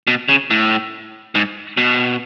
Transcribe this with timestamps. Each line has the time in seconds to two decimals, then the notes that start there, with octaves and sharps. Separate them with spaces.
0.07 B2
0.29 C#3
0.50 A2
1.35 G#2
1.77 B2